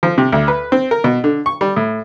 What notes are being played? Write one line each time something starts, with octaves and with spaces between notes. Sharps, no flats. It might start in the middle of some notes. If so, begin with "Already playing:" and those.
F3
C3
D2
B4
C4
A#4
B2
D3
C#6
G3
A2